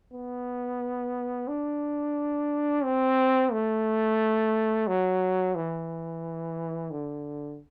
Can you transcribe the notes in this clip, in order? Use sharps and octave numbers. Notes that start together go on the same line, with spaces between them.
B3
D4
C4
A3
F#3
E3
D3